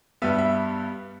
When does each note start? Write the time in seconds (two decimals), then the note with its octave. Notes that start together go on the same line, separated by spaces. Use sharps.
0.22 G2 G3 B3 E5
0.38 E5